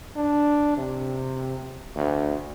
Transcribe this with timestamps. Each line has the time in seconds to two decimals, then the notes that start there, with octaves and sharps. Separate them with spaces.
0.16 D4
0.77 C3
1.96 D2